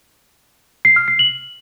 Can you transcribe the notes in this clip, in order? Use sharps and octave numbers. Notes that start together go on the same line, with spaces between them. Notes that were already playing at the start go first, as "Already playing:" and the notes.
C7
F6
C7
F#7